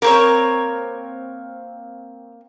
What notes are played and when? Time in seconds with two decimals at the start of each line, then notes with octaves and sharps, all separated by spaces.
0.02 A#3 C4 A#4 C#5